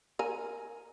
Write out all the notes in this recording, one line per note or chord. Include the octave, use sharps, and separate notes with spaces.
A#4 G#5